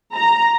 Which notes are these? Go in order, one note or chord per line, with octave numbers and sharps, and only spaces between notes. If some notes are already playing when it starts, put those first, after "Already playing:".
A#5